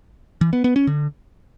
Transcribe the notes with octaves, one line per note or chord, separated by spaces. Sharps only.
E3
B3
B3
C#4
D3